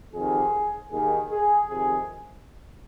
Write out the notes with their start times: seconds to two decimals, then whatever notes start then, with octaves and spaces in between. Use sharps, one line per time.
0.13 F2 C3 D#3 G#4
0.91 D#2 D#3 G#4
1.30 G#4
1.68 F2 C3 D#3 G#4